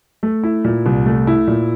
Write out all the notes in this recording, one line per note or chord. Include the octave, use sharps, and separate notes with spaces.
A3
E4
A#2
C2
A3
E4
A#2